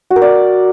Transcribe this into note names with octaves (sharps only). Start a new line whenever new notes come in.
F#4
A#4
D5